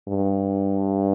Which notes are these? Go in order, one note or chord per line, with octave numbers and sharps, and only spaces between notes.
G2